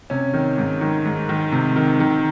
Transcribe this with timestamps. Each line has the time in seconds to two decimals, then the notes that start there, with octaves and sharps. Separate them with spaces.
0.10 C3 C#4
0.34 D#3
0.58 G#2
0.81 D#3
1.05 G#2
1.29 D#3
1.52 C3
1.76 D#3
2.00 D#3